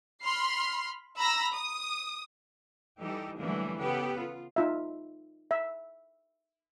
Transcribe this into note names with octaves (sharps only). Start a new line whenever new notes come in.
B5 C6 F6 C7
A#5 B5 E6 A#6
D#6
E3 G3 D#4 G4 A4
D3 E3 F#3 G3 A3 A#3
C#3 B3 G4 A4 B4
F4
D#4 F4 E5
E5